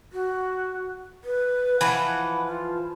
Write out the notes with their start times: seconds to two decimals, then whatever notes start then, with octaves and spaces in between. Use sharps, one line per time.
0.13 F#4
1.24 B4
1.81 E3 F3 B4 F#5
2.46 F4